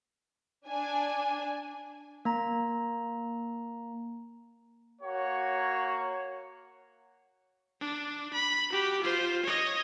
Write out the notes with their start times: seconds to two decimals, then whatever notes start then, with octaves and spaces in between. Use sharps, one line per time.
0.67 D4 G#5
2.25 A#3 A#5
5.01 A#3 F#4 C#5
7.81 D4
8.33 B5
8.70 F#4 G4
9.01 F4 C5
9.43 C#5 D#5